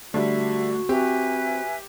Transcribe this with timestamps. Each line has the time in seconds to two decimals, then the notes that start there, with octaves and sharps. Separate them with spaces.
0.14 D3 G3 A3 F#4 E5
0.89 C4 G4 B4 E5 G#5